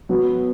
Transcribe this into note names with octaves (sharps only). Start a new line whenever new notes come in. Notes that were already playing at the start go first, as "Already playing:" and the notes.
F#3 B3